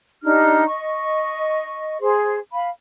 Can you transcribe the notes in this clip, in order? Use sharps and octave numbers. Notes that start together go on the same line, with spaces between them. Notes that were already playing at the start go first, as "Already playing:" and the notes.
D4 D#4 G4 F6
D#5 C#6
G#4 C5
F5 B5